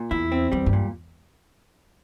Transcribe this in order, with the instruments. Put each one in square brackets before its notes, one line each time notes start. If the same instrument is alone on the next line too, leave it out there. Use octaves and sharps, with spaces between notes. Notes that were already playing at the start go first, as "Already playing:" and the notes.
Already playing: [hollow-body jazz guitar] A#2
[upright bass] E2 [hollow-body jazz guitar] E4
[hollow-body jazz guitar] C4
[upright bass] E2 [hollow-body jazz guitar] G3
[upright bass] G2
[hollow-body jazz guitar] A#2